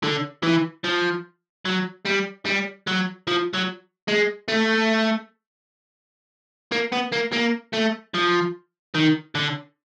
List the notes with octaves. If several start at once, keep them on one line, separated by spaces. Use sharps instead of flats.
D3
E3
F3
F#3
G3
G3
F#3
F3
F#3
G#3
A3
A#3
B3
A#3
A#3
A3
F3
D#3
D3